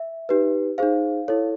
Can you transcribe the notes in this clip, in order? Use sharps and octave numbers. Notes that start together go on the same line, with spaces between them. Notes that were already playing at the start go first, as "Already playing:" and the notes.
Already playing: E5
D#4 G4 B4
D#4 G#4 C5 F5
E4 A4 C#5